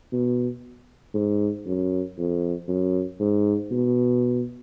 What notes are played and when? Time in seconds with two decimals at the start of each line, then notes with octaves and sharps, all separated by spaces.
0.12 B2
1.14 G#2
1.66 F#2
2.18 F2
2.69 F#2
3.20 G#2
3.71 B2